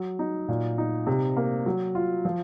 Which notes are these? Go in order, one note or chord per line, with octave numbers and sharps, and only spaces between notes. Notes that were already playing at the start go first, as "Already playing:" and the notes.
Already playing: F#3
D#4
A#2
D#4
C3
A#3
F#3
F4
F3